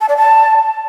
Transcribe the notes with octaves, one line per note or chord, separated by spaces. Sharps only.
A5
D5
A5